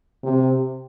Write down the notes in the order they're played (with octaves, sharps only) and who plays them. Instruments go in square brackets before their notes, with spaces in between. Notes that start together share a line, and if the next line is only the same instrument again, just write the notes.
[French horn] C3